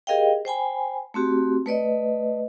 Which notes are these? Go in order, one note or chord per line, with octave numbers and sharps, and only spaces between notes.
G4 G#4 A#4 D#5 F5 G5
C5 G5 G#5 B5
A3 C4 F#4 G4
A3 B4 D5 D#5